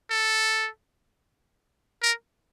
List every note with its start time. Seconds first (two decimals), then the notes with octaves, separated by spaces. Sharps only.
0.10 A4
2.02 A#4